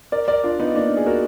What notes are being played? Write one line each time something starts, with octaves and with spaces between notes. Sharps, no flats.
A#4 D5
A#4 D5
D4 F4
B3 D#4
A#3 D4
G#4
F#4 A#4